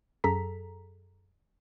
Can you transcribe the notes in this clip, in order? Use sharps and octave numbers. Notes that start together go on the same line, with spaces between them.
F#2 G#4 A4 A#5 B6